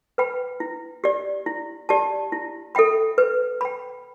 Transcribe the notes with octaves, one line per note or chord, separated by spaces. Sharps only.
B4 G5 B5
E4
G4 D5
E4
G4 D5 A5
E4
A4 E5 G5 B5
B4
G5 B5